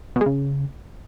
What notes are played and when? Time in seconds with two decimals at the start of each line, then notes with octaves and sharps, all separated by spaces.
0.16 B2
0.21 G#3
0.26 C#3